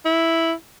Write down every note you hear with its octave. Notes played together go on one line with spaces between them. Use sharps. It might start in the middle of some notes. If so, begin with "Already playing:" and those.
E4